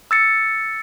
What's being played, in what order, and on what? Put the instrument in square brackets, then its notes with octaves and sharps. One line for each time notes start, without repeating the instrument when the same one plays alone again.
[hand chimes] E6 A6 C#7